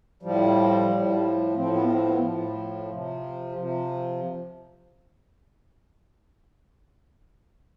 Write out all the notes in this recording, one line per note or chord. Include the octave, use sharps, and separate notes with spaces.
A2 F3 G3
A2 F3
A2 F3 C4
B3
C4
B3
A2 F3
C3 F3
C3 F3